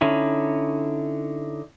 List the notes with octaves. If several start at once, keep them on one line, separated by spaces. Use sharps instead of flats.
D3 C#4 D#4 E4